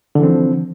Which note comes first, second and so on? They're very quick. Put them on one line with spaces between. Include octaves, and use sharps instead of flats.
D3 E3 C4 F3